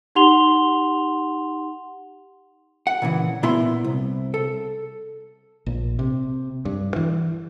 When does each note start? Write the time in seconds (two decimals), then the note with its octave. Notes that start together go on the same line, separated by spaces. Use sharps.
0.15 D#4 G4 F#5 C6 F7 G7
2.87 F#5
3.02 A#2 C#3 E3
3.43 A#2 B3 E4 C6
3.84 C2
4.34 A4
5.66 A#1
5.99 C3
6.65 G2
6.96 E3